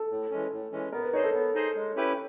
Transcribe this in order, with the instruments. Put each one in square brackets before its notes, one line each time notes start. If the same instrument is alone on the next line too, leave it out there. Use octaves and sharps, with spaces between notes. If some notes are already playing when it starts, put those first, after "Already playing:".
Already playing: [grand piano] A4
[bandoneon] A2
E3 G#3 C#4
A2
E3 G#3 C#4
[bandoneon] B3 [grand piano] A#4
[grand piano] B4
[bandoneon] D#4 G#4 C5 D#5 [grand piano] C#5
[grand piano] A4
[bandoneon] B3
D#4 G#4 C5 D#5
G#3
C#4 E4 G4 B4